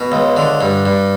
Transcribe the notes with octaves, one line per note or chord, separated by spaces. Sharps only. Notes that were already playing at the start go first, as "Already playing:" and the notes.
Already playing: B2
C#2
D3
G2
G2